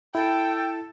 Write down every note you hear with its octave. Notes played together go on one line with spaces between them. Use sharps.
E4 A4 G5